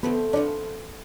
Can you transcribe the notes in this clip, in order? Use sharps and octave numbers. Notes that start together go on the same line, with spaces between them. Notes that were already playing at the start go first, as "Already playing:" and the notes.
D3 F3 A3 B3 C4
F3 B3 D4 F4